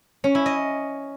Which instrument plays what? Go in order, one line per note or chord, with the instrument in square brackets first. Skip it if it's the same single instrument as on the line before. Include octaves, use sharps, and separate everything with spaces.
[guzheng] C#4
E4
D#5